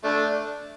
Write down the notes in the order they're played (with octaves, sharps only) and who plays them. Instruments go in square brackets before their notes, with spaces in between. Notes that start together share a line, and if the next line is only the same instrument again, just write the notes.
[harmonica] A3 D4